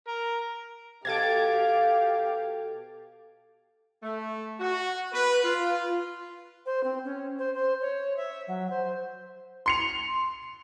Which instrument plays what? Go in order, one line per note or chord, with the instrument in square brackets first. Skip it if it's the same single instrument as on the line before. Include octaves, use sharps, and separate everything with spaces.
[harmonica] A#4
[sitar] B2 A4 [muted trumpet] G4 [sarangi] F5 [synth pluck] G#6 A6 D7
[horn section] A3
F#4
B4
F4
[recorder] C5
C4
C#4
C5
C5
C#5
E5
F#3
C5
[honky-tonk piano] C6 C#7 F7